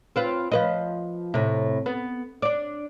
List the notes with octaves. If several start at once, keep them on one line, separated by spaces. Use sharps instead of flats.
C4 F4 B4
F3 B4 D#5
A2 C3
B3
D4 D5